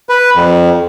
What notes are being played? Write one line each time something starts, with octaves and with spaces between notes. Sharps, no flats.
B4
F2